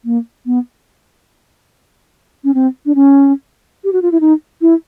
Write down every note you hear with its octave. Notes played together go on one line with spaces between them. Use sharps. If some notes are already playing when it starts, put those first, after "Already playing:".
A#3
B3
C#4
C4
D4
C#4
G4
F#4
F4
E4
D#4
E4